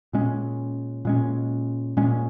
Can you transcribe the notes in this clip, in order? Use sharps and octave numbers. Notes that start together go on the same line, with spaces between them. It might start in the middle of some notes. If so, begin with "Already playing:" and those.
A#2 G#3 C#4
A#2 G#3 C#4
A#2 G#3 C#4